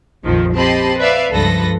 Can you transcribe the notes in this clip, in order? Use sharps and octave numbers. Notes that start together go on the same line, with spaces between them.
A#1 F2 D#3 F3
C4 G4 D#5 A5 B5 C6
B4 D5 E5 F5
C#2 G2 F3 A4 B4 A#6